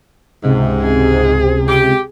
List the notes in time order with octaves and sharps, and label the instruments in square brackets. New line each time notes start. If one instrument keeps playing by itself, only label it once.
[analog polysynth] C#2 C3 [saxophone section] G#2
[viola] G#4
[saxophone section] G4